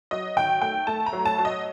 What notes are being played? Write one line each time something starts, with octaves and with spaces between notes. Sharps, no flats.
F#3 D#5
D#3 G5
A3 G5
A3 A5
A#5
F#3
A5
F#3
D#5